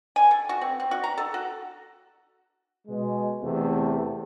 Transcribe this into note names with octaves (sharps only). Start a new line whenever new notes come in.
G#5
A4
F#4
C4
C4
F#4
A#5
A4
F#4
B2 G#3
E2 C3 A3